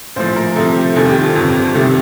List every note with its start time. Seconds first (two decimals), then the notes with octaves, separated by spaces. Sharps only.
0.16 A#1 A2 F3 C5
0.36 A#4
0.56 C2 C3 F3 A4
0.76 G4
0.95 F1 F2 D#3 G3 A4
1.09 G4
1.22 F4
1.35 G1 F2 C3 G4
1.55 G4
1.75 C2 C3 D#3 G3 A4